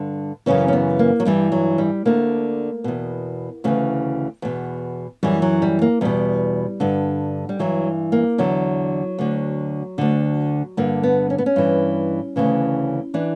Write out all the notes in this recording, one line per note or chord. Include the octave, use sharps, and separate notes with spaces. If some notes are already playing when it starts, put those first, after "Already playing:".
Already playing: G2 D3
F#2 C#3 E3 C#4
C#4
B3
A#3
F#3
G2 E3 G3
F#3
G3
D2 D3 A#3
E2 B2
D2 C#3 E3 F#3
E2 B2
F#2 E3 G3
F#3
G3
A#3
E2 B2 G3
G2 D3
G3
G2 E3 F#3
A#3
E2 D3 F#3
D2 D3
D2 D3
G2 D3 A#3
B3
C#4
B3
C#4
G2 E3
D2 C#3 E3
E3 D4